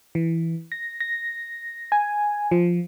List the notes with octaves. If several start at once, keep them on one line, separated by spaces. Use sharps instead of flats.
E3
A#6
A#6
G#5
F3